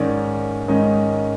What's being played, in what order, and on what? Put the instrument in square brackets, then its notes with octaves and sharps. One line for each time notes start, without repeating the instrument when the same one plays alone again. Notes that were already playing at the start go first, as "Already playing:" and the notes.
Already playing: [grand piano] G#2 D#3 G#3 C#4 D5
G#2 D#3 G#3 C#4 D#5